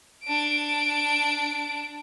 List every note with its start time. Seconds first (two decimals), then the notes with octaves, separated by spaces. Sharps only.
0.24 D4 D7